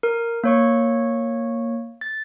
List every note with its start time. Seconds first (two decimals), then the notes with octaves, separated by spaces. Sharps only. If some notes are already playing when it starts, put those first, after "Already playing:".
0.03 A#4
0.44 A#3 C#5 C#6
2.01 A6